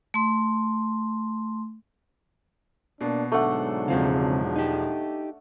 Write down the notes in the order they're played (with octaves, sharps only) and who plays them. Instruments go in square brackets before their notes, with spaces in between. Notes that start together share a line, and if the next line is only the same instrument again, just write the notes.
[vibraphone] A3 C6
[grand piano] B2 [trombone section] A#3 D4
[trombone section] G#2 D3 F#3 [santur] A3 D4 F#5
[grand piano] E1 F3 F5 [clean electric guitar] C#3 C4
[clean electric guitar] D#4 G4